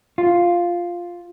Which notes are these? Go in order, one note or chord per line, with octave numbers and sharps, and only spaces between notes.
F4